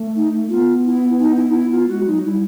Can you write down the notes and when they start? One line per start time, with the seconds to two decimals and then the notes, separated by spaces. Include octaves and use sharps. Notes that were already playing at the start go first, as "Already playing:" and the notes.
Already playing: A3
0.16 D#4
0.49 B3 F4
0.85 E4
1.20 D#4
1.36 E4
1.50 D#4
1.54 E4
1.72 F4
1.89 G#3 F#4
2.07 F#3 D#4
2.24 G3 E4